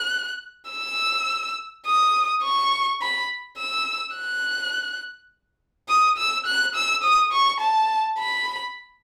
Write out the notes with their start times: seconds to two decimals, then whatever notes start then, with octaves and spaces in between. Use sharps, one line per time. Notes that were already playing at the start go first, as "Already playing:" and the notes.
Already playing: F#6
0.71 E6
1.87 D#6
2.44 C#6
3.02 B5
3.58 E6
4.17 F#6
5.88 D#6
6.18 E6
6.46 F#6
6.75 E6
7.03 D#6
7.33 C#6
7.60 A5
8.19 B5